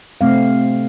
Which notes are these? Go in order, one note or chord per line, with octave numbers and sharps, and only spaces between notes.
C3 A3 C4 F5